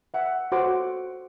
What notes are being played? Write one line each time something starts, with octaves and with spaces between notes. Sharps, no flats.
E5 F#5
F#4 A4 C5 F#5 D6